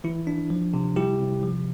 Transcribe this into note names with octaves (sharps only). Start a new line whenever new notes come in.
E3 E4
D4
F3
C3
G3 E4 G4
C3
F3